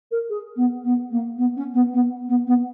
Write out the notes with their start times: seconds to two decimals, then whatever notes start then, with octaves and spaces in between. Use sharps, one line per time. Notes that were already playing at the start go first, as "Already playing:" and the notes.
0.11 A#4
0.29 G#4
0.56 B3
0.84 B3
1.10 A#3
1.38 B3
1.56 C#4
1.73 B3
1.93 B3
2.28 B3
2.47 B3